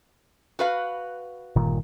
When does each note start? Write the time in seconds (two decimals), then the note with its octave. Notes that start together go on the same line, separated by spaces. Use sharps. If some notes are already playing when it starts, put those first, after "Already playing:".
0.59 F#4 B4 F5
1.56 G1 A#2 D#3